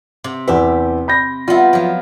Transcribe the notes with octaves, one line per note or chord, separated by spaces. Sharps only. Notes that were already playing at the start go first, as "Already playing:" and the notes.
C3
E2 G4 B4 E5
B5 G6 A#6
G3 B3 F4 E5
F3 F#3